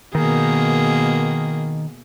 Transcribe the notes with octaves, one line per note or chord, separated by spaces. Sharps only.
B2 D#3 A#3 G#4